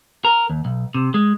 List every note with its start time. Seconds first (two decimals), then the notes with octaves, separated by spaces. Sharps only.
0.25 A#4
0.50 D#2
0.65 B1
0.95 C3
1.14 G#3